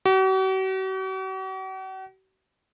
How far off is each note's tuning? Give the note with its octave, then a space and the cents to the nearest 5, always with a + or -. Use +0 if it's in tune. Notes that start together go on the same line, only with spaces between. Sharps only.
F#4 +45